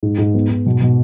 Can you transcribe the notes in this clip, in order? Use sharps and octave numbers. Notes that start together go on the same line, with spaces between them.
G#2
G#2
B3
G#2
B2
B2